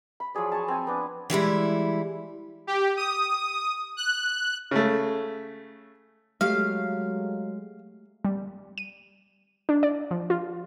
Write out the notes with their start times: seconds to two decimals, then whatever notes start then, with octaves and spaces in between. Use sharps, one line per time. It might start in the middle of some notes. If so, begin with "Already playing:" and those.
0.20 B5
0.35 F3 F#3 G#4 D5
0.52 C#5 G#5 A5
0.68 C4 G#5
0.87 B3 D4
1.30 E3 G3 G#3 E4
2.67 G4
2.97 D#6
3.97 F#6
4.71 C#3 A3
6.41 F#3 G#3 A3 G4 F5
8.25 G3
8.78 D#7
9.69 D4
9.83 D5
10.11 F3
10.30 F4